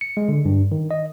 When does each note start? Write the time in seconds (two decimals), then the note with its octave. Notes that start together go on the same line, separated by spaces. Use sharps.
0.01 C#7
0.17 G#3
0.29 D3
0.45 G2
0.72 D#3
0.91 D#5